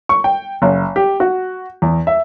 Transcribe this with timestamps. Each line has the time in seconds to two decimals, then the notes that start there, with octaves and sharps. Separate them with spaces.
0.09 C#6
0.24 G5
0.62 F#1
0.96 G4
1.20 F#4
1.82 E2
2.07 E5